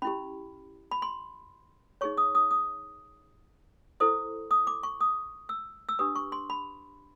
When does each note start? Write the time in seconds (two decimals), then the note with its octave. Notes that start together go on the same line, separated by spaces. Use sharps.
0.02 C#4 E4 G4 B5
0.91 B5
1.02 C6
2.01 D#4 G#4 C#5 C#6
2.17 D#6
2.35 D#6
2.51 D#6
4.00 E4 A4 C5 D#6
4.51 D#6
4.67 D6
4.83 C#6
5.01 D#6
5.49 E6
5.89 E6
5.99 D4 G4 B4 D#6
6.15 C#6
6.32 C6
6.50 B5